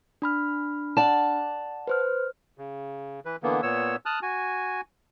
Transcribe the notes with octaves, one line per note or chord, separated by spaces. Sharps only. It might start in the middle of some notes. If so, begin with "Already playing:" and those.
D4 B5 F6
D5 F#5 A5
B4 C5 F6
C#3
E3 B4
D3 E3 A#3 B3
A#2 B3 C#5 E6
A5 D#6 F6 F#6
F#4 G#5